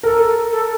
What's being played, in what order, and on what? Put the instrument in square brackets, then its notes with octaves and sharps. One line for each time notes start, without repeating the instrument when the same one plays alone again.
[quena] A4 [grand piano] A#4
[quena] A4